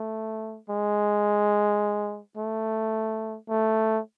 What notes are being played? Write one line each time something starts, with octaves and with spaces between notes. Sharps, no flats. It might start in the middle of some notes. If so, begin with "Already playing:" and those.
Already playing: A3
G#3
A3
A3